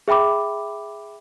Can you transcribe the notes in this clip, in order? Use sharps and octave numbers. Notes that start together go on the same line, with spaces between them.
G#4 E5 G5 B5 D6